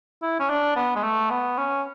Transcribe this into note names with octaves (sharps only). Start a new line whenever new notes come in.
E4
C#4
D4
B3
G#3
A3
B3
C#4